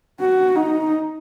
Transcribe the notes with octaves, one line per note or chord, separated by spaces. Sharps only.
F#4
D#4